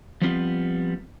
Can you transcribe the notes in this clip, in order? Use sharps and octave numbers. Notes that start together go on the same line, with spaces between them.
F3 G3 B3 C4 F4